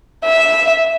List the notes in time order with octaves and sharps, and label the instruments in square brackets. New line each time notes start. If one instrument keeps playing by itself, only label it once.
[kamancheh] E5